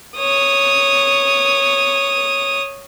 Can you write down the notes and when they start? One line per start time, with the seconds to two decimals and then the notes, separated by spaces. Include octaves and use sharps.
0.17 C#5 D#6